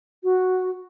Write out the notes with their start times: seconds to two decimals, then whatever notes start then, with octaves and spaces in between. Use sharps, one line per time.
0.24 F#4